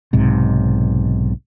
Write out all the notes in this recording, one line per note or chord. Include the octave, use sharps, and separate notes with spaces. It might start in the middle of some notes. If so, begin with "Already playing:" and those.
B1 G#2 C3